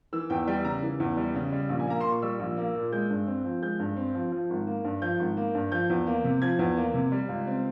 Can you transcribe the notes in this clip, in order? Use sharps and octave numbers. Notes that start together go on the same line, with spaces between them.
E3 E6
E2 G5
G3 G5
C#3 A#5
E3
E2
G3
C#3
G3
A#1
G#5
A#3 A#5
A#2 C6
C#6
G3 E6
A#1
A#3
A#2
G#3 G6
G2
C4
F3
G#3 G6
G2
C4
F3
F3
G#1
A#3
G2
F3 G6
G#1
A#3
G2
F3 G6
E2
A#3
C3
F3 G#6
E2
A#3
C3
G3
C#2
C4